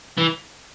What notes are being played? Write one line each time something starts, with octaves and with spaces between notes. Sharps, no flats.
E3